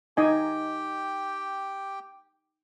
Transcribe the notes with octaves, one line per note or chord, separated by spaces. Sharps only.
D#4 G4 D#5 G5 G#5